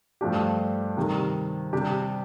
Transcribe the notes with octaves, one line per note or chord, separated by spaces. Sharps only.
G2 F3 A3 D4 G4
C3 D#3 G3
C3 G3 D4 G4